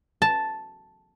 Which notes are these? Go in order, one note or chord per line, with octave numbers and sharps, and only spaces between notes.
A5